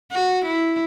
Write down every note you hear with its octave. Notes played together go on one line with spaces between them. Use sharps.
F#4
E4